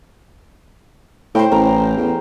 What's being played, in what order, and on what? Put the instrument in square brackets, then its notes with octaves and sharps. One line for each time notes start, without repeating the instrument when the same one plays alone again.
[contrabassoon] A2 [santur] C5 G5
[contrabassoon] A1 [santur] A#4
[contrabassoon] E2